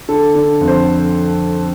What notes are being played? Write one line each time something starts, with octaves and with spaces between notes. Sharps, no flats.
D3 A4
D3
F2
C5